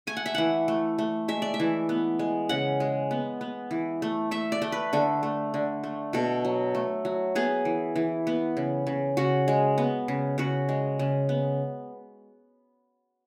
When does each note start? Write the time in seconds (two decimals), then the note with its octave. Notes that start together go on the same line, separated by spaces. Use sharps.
0.07 A3 G#5
0.17 F#5
0.26 E5
0.35 E3 F#5
0.68 A3
0.99 A3
1.28 G#3 E5
1.42 D5
1.54 E5
1.60 E3
1.89 B3
2.19 G#3
2.49 C#3 F#5
2.80 G#3
3.11 B3
3.41 B3
3.71 E3
4.02 A3
4.31 A3 E5
4.52 D5
4.62 A3
4.72 B4
4.93 D3 A4
5.23 A3
5.54 D3
5.83 A3
6.13 B2 A4
6.45 F#3
6.75 A3
7.05 F#3
7.35 B3 G#4
7.65 E3
7.96 E3
8.27 B3
8.57 C#3
8.87 C#3
9.17 C#3 F#4
9.48 G#3
9.78 B3
10.08 C#3
10.38 C#3 F#4
10.69 G#3
10.99 C#3
11.29 B3